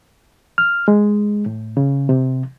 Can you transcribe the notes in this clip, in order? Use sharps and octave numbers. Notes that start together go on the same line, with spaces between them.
F6
G#3
A2
C#3
C3